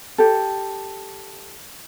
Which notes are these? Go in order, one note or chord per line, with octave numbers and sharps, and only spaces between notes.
G4 A4